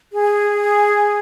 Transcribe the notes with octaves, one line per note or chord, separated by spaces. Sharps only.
G#4